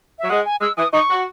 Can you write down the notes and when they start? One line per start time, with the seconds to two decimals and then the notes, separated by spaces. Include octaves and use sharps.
0.19 F#3 E5
0.30 G#3 F#5
0.45 G#5
0.61 G#3 E6
0.77 E3 D#6
0.93 D#4 C#6
1.09 F#4